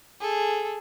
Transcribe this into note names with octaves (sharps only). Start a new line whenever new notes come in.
G#4 A4